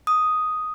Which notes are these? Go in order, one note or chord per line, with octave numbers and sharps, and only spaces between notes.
D#6